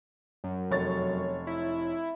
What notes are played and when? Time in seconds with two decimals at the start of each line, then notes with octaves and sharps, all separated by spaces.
0.44 F#2
0.71 F1 C#5 A6
1.47 E4